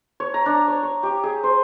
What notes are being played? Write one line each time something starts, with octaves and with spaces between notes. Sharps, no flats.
C#5
A#5
D4
C#5
C#6
G4
G#4
C5